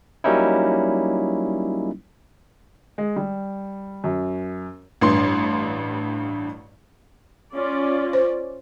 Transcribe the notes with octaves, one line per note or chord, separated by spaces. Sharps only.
F#3 G3 A#3 C#4 D#4 E4
G#3
G3
F#2
A1 G2 C6
C#4 F4 D5
C5